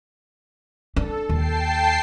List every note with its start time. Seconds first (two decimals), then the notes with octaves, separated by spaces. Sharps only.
0.96 D4 A4
1.29 D#2 G5 A5 C7